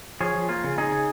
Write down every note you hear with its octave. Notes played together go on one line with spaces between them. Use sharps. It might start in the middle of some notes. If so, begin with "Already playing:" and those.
F3 G#4 C#5
F3
A#3 F4
C#3
C#3 D#4 G#4
C#3